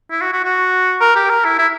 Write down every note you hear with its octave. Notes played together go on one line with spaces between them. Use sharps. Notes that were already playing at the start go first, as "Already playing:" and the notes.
E4
F#4
F#4
F#4
A#4
G4
A#4
E4
E4